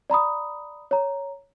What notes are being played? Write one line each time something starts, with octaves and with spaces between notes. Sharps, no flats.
D5 A#5 B5 D#6
C#5 A#5